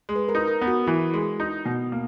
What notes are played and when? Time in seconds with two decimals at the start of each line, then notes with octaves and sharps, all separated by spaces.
0.09 G#3
0.16 B4
0.29 A#4
0.35 D#4
0.48 A#4
0.61 B3
0.67 F#4
0.87 E3 E4
1.14 G#3
1.40 D#4
1.65 B2
1.92 A#3